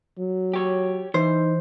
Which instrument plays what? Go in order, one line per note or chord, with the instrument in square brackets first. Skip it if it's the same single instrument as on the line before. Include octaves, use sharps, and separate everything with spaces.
[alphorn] F#3
[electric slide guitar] G4 C#5
[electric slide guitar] E3 [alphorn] D#4 [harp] C5